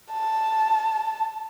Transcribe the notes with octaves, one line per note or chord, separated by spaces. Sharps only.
A5